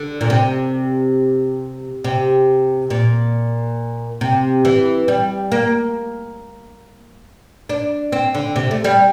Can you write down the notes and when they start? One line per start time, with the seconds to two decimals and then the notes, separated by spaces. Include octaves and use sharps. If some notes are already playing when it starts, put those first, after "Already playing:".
Already playing: D3
0.21 A#2
0.30 C3
2.04 C3
2.90 A#2
4.21 C3
4.65 E3
5.08 G3
5.52 A#3
7.69 D4
8.12 C4
8.34 D3
8.56 C3
8.71 A3
8.84 G3